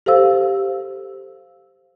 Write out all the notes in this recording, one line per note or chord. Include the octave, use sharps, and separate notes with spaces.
G4 A4 C5 F5 E6